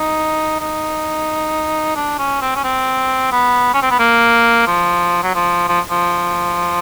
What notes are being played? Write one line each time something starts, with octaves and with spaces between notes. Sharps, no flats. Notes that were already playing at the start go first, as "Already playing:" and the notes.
Already playing: D#4
D#4
D4
C#4
C4
C#4
C4
B3
C#4
C4
B3
A#3
F3
F#3
F3
F3
F3